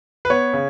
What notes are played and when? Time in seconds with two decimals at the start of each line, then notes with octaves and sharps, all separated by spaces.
0.25 B4
0.30 B3 C#5
0.54 C#3